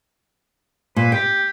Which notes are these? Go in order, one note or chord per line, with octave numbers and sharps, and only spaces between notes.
A#2 B4
G4 G5